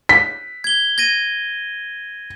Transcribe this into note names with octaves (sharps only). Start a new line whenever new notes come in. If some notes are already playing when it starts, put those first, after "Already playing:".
B6
G#6 G7
G#6 A#6 D#7